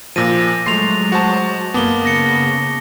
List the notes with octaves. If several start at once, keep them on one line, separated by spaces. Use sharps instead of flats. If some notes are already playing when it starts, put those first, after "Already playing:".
A#2 F3 D6 A#6 D#7
F#3 G#3 A3 C6 A6 C7 F7
F#4 C5 A5
F#2 A#3 B3 A5 D6 G7
C#3 A#6 C#7